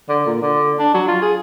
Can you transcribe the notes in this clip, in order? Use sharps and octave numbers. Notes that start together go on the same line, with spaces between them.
D3
A#2
D3
D4
F#3
F4
G#4